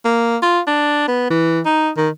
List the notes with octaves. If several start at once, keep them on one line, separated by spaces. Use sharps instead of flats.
A#3
F4
D4
B3
E3
D#4
D#3